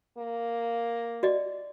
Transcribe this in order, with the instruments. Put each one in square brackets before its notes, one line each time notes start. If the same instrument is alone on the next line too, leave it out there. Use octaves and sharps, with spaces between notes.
[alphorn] A#3
[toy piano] F#4 D5 D#5